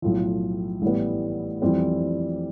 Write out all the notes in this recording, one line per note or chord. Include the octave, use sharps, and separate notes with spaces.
B1 A2 F3
A1 A2 E3 G3 B3
F2 E3 G3 C4